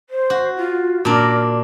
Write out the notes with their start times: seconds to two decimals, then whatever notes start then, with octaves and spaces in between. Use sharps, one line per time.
0.09 C5
0.30 F#4
0.56 F4
1.05 A#2 D4 A#4